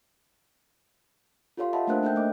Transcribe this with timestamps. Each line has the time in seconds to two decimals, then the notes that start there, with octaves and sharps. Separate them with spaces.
1.57 F4 G4 A4 C#5 F5 C6
1.73 D#5 E5 F#5 A5 B5
1.87 A3 A#3 D4 A#4 C5 F#6
2.03 A#3 D#4 A4 E5 G5 G6
2.14 A3 A#3 D#5 D6